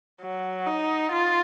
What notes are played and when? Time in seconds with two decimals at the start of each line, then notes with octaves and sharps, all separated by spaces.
0.22 F#3
0.67 D#4
1.12 F4